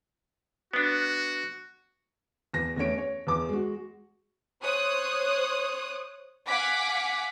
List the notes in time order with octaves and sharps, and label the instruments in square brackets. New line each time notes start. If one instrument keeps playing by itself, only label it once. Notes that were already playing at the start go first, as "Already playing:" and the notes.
[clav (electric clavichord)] B3 D4 [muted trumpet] F#4
[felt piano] E2 A#6
E2 A3 C#4 C#5 D7
C#5
E2 G#4 D6
G#3 F#4
[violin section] C5 C#5 D#6 F#6
F5 F#5 G#5 D6 B6